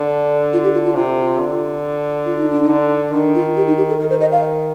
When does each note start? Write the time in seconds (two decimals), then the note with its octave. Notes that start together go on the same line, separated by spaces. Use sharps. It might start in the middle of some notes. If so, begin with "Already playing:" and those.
Already playing: D3
0.53 F4
0.64 G4
0.74 F4
0.85 F4
0.95 C3 F4
1.18 F4
1.40 D3
2.25 F4
2.38 D#4
2.50 D4
2.63 D#4
2.69 D3
3.13 D#3 D4
3.35 F4
3.57 G4
3.67 D#4
3.77 G4
3.89 A4
3.99 D#3 A#4
4.10 C5
4.21 D#5
4.32 F5